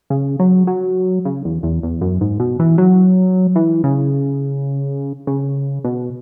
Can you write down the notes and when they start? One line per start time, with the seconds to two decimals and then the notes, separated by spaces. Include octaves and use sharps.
0.10 C#3
0.39 F#3
0.67 F#3
1.25 C#3
1.45 E2
1.63 E2
1.83 E2
2.01 F#2
2.21 G#2
2.40 B2
2.59 E3
2.78 F#3
3.56 E3
3.84 C#3
5.27 C#3
5.84 B2